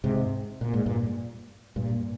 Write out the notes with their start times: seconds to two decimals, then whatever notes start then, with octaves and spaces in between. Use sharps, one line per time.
0.04 G#2 C3
0.61 A#2
0.73 G#2
0.86 G2 A#2
1.76 G2 A#2